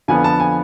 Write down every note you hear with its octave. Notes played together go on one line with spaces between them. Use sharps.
F2 D3 F3 B3 G#5
A5
G#5